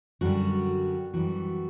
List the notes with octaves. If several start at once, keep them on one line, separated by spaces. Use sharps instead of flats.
F#2 D3 G3 F#4
F#2 E3 G3 F#4